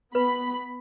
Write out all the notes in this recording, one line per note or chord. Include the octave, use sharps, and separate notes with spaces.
B3 B4 B5